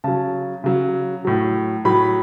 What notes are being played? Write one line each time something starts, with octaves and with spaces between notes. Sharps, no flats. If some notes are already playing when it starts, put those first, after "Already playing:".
C#3 F#3 A5
C#3 F#3
A2 F#3
A2 F#3 B5